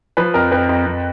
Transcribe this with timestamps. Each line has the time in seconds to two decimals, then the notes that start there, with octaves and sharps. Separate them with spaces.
0.17 F3 B4
0.34 F2 A#4
0.51 F2 B4
0.69 F2
0.86 F2